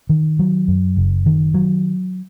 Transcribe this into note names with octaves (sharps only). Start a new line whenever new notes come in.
D#3
F#3
F#2
F#1
D#3
F#3